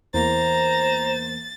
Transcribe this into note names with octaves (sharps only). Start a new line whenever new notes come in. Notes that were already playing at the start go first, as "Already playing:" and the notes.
E2 A#3 C5 A#5 A6